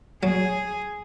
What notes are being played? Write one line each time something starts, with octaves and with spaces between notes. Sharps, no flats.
F#3 G#4